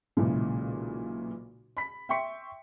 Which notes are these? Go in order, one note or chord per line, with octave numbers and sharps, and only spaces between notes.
B1 A#2 C#3 E3 G#3
B5 B6
E5 G5 C6 C#6 B6 C#7